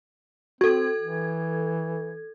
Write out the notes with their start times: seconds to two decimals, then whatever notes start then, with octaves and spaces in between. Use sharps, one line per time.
0.61 C4 F#4 A4 G#6
1.00 E3